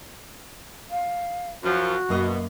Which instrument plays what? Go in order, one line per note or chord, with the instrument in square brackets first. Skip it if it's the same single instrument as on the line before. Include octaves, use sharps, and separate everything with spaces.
[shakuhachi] F5
[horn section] F#2 F3 [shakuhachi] F#4
[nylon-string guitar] F#2 A#3 D#5 [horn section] B2